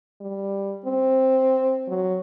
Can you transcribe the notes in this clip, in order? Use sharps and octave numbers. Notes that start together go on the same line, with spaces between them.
G3
C4
F#3